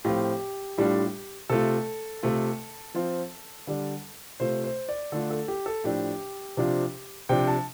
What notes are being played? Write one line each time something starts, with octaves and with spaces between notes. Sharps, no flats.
A2 F3 C4 F4 G4
A2 G3 D4 F4
C3 A3 F4 A4
C3 A3 F4
F3 C4 F4
D3 G3 D4
C3 A3 F4 C5
C5
D5
D3 A3 D4 F4 A4
A4
G4
A4
A2 F3 D4 G4
C3 F3 D4 F4
C3 F3 D4 G5
A5